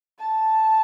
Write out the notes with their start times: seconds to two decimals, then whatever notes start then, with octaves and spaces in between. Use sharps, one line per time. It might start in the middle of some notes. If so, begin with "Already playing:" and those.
0.19 A5